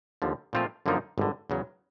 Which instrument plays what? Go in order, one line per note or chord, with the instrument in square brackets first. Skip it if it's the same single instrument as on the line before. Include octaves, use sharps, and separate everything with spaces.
[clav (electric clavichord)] D#2 D3 F3
A#2 F3 A3 C4 F4
F#2 D3 F3 A#3 D#4
G#1 G2 D3
E2 C#3 F#3